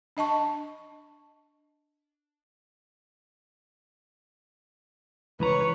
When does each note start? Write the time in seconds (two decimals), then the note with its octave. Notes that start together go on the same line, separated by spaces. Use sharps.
0.17 D4 D#5 A5 C#6
5.40 C#2 E3 B4 C#5 A#5